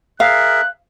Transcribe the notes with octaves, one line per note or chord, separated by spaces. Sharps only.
G#4 A#4 E5 F5 F#6